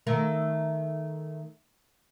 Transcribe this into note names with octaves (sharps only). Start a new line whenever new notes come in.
D#3 A3 A#4